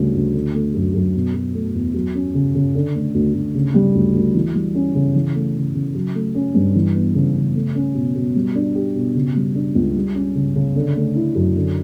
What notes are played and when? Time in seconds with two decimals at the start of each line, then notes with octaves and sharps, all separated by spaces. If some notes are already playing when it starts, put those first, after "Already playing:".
Already playing: D2 C#3 G3
0.15 D2
0.34 D3
0.54 A3
0.74 F#2
0.94 F#2
1.14 B2
1.34 F#3
1.54 A3
1.75 E2
1.94 F#3
2.15 C#4
2.34 C#3
2.55 C#3
2.75 D3
2.95 A3
3.15 D2
3.34 D2
3.55 C#3
3.74 G3
3.95 D2
4.15 D2
4.34 E3
4.54 G3
4.75 C#4
4.95 C#3
5.15 E3
5.35 A3
5.55 C#3
5.75 C#3
5.95 F#3
6.15 A3
6.35 C#4
6.54 G2
6.75 E3
6.95 B3
7.15 C#3
7.34 C#3
7.55 A3
7.75 C#4
7.95 B2
8.15 B2
8.35 G3
8.55 D4
8.75 G4
8.95 B2
9.15 C#3
9.35 G3
9.55 D4
9.75 C#2
9.95 G3
10.15 C#4
10.35 C#3
10.55 C#3
10.75 D3
10.95 A3
11.15 E4
11.35 F#2
11.55 D3